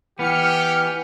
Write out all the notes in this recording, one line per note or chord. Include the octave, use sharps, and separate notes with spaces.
E3 B3 G4 F6 C#7